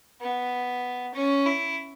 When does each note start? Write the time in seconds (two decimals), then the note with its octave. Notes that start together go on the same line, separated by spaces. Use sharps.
0.21 B3
1.14 C#4
1.46 E4